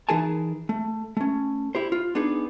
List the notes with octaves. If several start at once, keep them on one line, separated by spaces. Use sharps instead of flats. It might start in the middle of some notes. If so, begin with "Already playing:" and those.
E3 D#4 G#4 A#4 G#5 A5
A3
A3 C#4
E4 G4 C5
F4
B3 D4 D#4 G#4